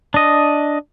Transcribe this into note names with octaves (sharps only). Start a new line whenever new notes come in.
D4 D#5